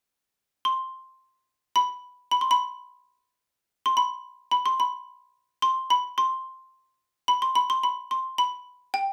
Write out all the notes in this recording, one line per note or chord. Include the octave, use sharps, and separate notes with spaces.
C6
B5
B5
C6
B5
C6
B5
B5
C6
B5
C6
B5
C6
B5
C6
B5
C6
B5
C6
B5
G5